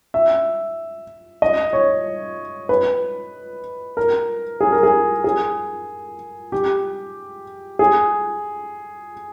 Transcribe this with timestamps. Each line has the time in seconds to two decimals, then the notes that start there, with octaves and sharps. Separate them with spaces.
0.14 E5
1.42 D#5
1.73 C#5
2.69 B4
3.97 A#4
4.61 G#4
4.72 A#4
4.83 G#4
5.24 G#4
6.52 G4
7.79 G#4